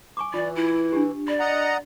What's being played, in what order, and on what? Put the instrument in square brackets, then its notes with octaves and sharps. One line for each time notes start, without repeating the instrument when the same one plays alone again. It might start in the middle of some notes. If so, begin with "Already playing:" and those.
[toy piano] G#5 C#6 D6
[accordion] E3 [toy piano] F4 [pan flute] D5
[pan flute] E4
[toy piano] D4 G4
[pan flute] D5 [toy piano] B5
[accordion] D#5 F#5 A#5